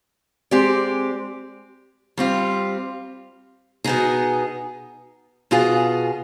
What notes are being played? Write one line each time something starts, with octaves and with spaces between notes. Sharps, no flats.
G#3 C4 G4 D5
G3 C4 F4
B2 B3 D#4 G#4
B2 B3 F4 G#4